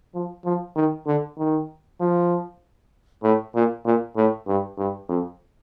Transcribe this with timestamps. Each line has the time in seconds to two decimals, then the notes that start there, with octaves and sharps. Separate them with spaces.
0.15 F3
0.45 F3
0.76 D#3
1.07 D3
1.38 D#3
2.00 F3
3.23 A2
3.55 A#2
3.85 A#2
4.17 A2
4.48 G2
4.78 G2
5.09 F2